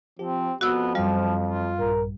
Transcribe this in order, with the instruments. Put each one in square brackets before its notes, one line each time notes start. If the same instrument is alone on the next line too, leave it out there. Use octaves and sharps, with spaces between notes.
[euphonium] F3 [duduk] C4 [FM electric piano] G4
[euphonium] F2 [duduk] B3 [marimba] F#4 E6
[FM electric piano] F#2 F5 [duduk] F3 [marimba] G3
[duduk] F4
[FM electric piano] A#1 G2 [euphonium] A#4